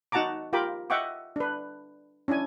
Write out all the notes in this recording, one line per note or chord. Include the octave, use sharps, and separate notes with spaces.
D#4 F#4 F#5 A5 A#5 D6
F4 G4 A#4 G5 B5 D6
D#5 E5 F#5 G5 C#6 D6
D4 B4
C#4 D4 E4 G#5